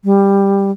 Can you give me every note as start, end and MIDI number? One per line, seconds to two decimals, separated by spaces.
0.04 0.71 55